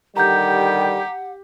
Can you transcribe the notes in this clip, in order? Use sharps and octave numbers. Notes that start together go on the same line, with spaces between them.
D3 D#3 G3 G4 F#5 A#5 G6